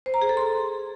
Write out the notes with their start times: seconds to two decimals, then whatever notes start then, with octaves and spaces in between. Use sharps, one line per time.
0.06 C5
0.14 A#5
0.22 G#4
0.29 A4
0.37 C6